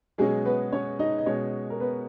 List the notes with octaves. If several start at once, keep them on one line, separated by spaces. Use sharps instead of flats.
B2 F#3 G#3 C#4 G#4
B3 B4
C#4 C#5
D#4 D#5
D#5
B2 G#3 C#4 C#5
A#4
B3 B4